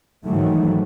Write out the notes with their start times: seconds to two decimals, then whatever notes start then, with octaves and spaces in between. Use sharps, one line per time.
0.24 G#2 D#3 E3 F#3 A3